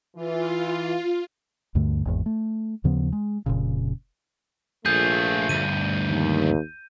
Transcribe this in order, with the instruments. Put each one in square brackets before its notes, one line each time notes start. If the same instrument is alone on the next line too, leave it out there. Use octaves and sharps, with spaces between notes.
[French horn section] E3 [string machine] F4
[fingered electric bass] D2 G2 D3 A3
G#1 E2 G#2
A3
D#2 C#3 F3 B3
G#3
F1 A#2 C#3
[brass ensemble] A#1 A3 [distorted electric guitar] F4 G#4 [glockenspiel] G6
[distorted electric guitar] D2 G2 [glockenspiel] D#7
[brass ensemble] D#2